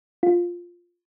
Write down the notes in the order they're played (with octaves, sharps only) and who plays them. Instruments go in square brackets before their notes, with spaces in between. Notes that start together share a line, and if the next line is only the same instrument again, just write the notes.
[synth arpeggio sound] F4